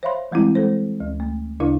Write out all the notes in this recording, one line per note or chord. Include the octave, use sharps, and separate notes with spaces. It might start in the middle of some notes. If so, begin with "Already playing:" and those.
C5 C#5 E5 F5 B5 C6
E3 G3 G#3 C4 E4
G#3 A4 C5
D2
A3
D2 C#3 D4 E4 A#4 F5